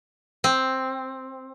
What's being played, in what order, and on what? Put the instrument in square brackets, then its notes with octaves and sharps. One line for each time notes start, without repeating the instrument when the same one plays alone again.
[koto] C4